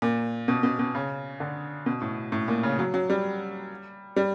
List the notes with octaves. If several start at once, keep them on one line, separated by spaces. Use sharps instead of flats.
A#2
B2
B2
B2
C#3
D3
B2
A2
A2
A#2
C#3
F#3
F#3
G3
G3